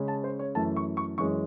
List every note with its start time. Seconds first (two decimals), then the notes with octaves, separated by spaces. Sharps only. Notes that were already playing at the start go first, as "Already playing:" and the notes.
Already playing: C#3 G#3 C#4
0.08 A5
0.24 C5
0.39 C#5
0.55 F#2 E3 A3 A5
0.76 C#6
0.97 C#6
1.18 F#2 E3 G#3 C#4 C#6